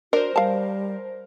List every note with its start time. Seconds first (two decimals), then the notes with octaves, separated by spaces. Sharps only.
0.13 D4 F#4 A#4 C5
0.36 G3 F5 A5